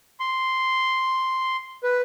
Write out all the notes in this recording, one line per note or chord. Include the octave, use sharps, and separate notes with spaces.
C6
B4